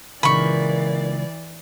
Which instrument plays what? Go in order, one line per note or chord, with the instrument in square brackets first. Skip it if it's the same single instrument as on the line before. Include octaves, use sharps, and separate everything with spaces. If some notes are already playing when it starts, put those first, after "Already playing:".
[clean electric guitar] C#2 [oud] A#2 D#3 [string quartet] E3 D5 [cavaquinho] B5 C#6